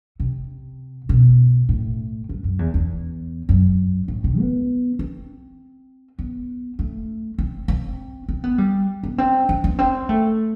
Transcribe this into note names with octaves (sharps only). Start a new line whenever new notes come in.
C3
B2
A2
G2
F#2
E2
E2
F#2
A2
C3
B3
C4
B3
A3
C4
C4
C4
B3
G3
B3
C4
D4
B3
C4
A3